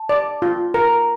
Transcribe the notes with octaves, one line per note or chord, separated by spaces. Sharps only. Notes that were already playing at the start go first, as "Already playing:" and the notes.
Already playing: A5
D5
F4
A#4 A#5